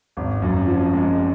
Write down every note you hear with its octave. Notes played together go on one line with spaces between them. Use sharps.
G#1
F#2
F3
G#3